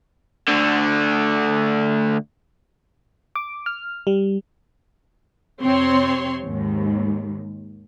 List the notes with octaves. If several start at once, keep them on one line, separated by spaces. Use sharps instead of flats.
D2 D3
D6
F6
G3
F2 C3 C4 C#5 C6
D#2 G#2